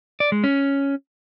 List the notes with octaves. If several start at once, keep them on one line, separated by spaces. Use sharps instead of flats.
D5
G#3
C#4